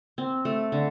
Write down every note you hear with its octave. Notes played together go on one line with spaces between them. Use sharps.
C4
A3
D3